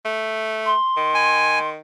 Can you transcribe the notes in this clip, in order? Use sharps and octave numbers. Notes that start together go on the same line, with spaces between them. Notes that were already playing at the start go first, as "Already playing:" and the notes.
A3
C6
D#3
G#5